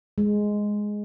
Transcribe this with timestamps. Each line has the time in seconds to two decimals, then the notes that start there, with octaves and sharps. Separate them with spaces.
0.18 G#3